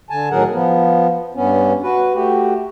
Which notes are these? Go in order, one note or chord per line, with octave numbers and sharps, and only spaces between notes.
D3 G#5 A5
A2 D#3 F#3 G#4 A#4 F#5
F3 B3
G2 B3 C#4
F#4 B4
A3 F#4 G4